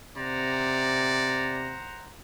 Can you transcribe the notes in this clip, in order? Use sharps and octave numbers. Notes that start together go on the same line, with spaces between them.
C3 C5 D5 F#5 A#5